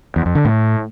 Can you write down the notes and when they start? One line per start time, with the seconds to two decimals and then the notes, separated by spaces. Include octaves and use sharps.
0.16 E2
0.26 F2
0.35 D3
0.45 A2